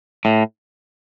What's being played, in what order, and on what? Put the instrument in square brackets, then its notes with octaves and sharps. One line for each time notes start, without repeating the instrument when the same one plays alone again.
[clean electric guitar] A2